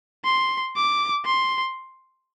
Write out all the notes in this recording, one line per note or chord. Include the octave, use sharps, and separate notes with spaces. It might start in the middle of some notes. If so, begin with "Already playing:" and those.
C6
D6
C6